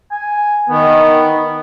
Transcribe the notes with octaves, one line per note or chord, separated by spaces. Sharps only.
G#5
D#3 B3